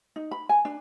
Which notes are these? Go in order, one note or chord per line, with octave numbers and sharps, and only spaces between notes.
D#4
B5
G#5
D4